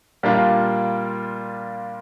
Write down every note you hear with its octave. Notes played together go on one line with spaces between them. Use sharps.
A#2 G3 A#3 D4 F4